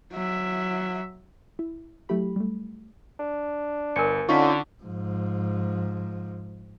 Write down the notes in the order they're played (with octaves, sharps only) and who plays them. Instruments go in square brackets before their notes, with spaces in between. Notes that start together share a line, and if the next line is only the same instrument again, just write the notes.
[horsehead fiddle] F#3 E5
[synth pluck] E4
F#3 A3 E4 G4 B5
G3 A3
[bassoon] D4
[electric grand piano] G1 [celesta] A#4 G#5 C#7
[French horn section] D3 [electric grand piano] C#4 D#4 F4 [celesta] C#6 B6
[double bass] G#2 F3